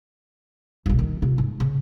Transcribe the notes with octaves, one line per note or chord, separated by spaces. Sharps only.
D#1 B1
D#3
C3 F4
G#2
C#3